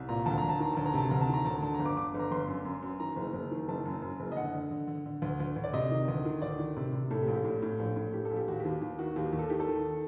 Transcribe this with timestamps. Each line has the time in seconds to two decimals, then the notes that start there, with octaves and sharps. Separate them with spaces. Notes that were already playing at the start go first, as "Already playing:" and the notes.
Already playing: C2
0.09 A#2 A#5
0.26 D2 A5
0.38 A#5
0.43 D2
0.49 A5
0.60 D#3 A#5
0.74 D2 A5
0.86 A#5
0.94 C3 A5
1.10 D2 A#5
1.21 A5
1.29 D#3
1.34 A#5
1.45 D2 A5
1.62 D3 A5
1.74 A#5
1.80 G1
1.85 D6
1.97 D3 D6
2.14 G1
2.19 A#5
2.31 G1 C6
2.48 F#2
2.65 F#2
2.82 F#2
3.00 D#3 A#5
3.16 F#1
3.33 F#1
3.51 D#3
3.68 F#1 A5
3.85 F#2
4.02 F#2
4.20 F#1
4.32 D#5
4.36 D3 F#5
4.54 D3
4.71 D3
4.87 D3
5.06 D3
5.22 D2
5.40 D2
5.56 D2
5.64 D5
5.73 C3 D#5
5.91 D#3
6.08 D2
6.25 D#3
6.42 D2 D5
6.59 D#3
6.76 C3
6.93 C3
7.10 A2 A4
7.23 G4
7.27 A#1
7.34 G4
7.45 A2
7.62 A2
7.79 A#1
7.96 A2
8.13 A2 G4
8.25 A4
8.31 A#1
8.36 G4
8.48 D#2 F#4
8.60 D#2 G4
8.81 D#2
8.99 D#3 F#4
9.16 D#2 G4
9.33 D#2
9.39 A4
9.50 D#3 G4
9.60 A4
9.68 D#3